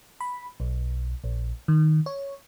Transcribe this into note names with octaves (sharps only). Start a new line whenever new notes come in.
B5
B1
A#1
D#3
C#5